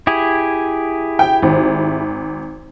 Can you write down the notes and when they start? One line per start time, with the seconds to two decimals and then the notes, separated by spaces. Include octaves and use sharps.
0.07 E4 G4 G#4
1.19 G5
1.42 G#1